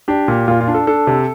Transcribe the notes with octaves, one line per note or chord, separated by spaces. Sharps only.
D4 G4
A#2
A#2 F4
F4
D4
A4
D4 A4
C3